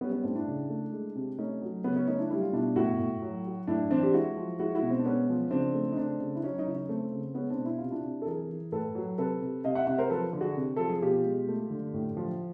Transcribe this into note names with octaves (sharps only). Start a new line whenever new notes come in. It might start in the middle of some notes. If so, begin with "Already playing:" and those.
G3 B3 C#4
B3 C#4
A2 C4 D4
D4 E4
C#3
A3
G#3
C3
A3 C#4 D#4
F#3
C#3 B3 C#4
B3 C#4
A3 C#4 D#4
D4 E4
G3 E4
F4
B2 D4 E4
A2 E4 F#4
A2
F#3
F#3
A2 D4 E4
E3 C4 D4
G4
G#3 E4 F#4
F3
G#3 E4 F#4
E4 F#4
B2
C4
D4
G#3 B3 C#4
F3
C#3 C4 D4
A3
D#4
C#3 C4 D4
C#3
E4
F#3 C#4 D#4
C#4 D#4
C#3 E4
C#4 D#4
A3 C4
C#3
G#3 B3 C#4
C4 D4
B2
E4
C3 F4
D4 E4
C3
A4
E3 G#4 A#4
E3
A2 A4 B4
F#3
C3 A4 B4
C3
C3 D#5 F5
E5 F#5
C3 E5 F#5
A#4 C5
F3 A4 B4
D3
F#4 G#4
C3
F3 A4
G#4
B2 F4 G4
G#3
A3
D3
A2
F3